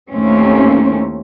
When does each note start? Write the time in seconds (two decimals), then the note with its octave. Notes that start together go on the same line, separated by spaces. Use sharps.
0.12 D#2 A2 A3 A#3 C4 C#4